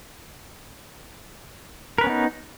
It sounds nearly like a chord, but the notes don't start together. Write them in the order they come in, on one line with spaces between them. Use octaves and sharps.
A#4 B4 C#4 B3 D#4